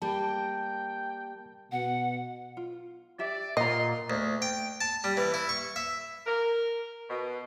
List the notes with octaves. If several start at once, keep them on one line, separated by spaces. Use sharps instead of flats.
G3 A#3 G5 A5
B2 F#5
F4
G4 D5 E5
A#2 D#5 F#5 A#5 C6
D2
G5
A5
G3
E3
E4
C#6
E5
A#4
B2